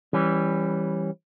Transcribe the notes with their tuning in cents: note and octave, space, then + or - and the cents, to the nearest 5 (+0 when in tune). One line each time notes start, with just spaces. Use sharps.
E3 +0 G3 +0 C#4 -20